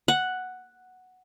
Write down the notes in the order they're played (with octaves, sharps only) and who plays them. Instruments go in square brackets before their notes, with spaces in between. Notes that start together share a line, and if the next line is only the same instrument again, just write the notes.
[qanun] F#5